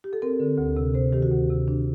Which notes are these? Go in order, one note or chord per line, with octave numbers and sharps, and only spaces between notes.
G4
A4
C4 A#4
D3
D2
C3
C3 C5
D#3 G4
F#4
D2
C3
D4